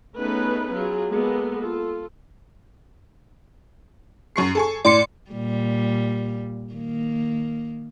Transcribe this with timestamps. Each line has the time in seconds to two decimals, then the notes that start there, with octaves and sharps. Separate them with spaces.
0.18 A3 B3 C#4 D#4 G#4 B4
0.75 F#3 F4 G#4
1.10 G#3 A#3 B3 A4
1.58 F4 A4
4.36 F#2 C#6 C7
4.55 A4 G#5 C#6
4.85 A2 D5 C6 C#7
5.31 A#2 G3
6.74 D#3 A#3